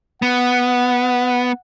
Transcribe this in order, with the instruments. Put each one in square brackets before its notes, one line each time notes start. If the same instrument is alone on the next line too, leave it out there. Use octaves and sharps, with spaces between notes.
[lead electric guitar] B3 [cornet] F#5